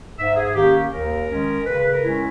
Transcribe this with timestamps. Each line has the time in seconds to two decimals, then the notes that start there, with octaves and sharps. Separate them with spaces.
0.18 G#2 E5
0.36 G#4
0.55 D#3 A#3 C#4 G4
0.92 D#2 A#4
1.29 D#3 G#3 C#4
1.66 C#3 B4
1.91 A#4
2.04 G#3 C#4 E4